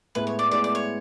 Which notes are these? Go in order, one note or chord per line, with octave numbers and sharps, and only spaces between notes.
A2 G#3 B3 E4 B4
C#5
D5
A2 G#3 B3 E4 D5
D5
C#5